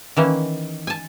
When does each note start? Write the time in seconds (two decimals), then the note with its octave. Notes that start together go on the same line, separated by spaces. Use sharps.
0.17 D#3 E3 A#3 C#4
0.87 G#5 A5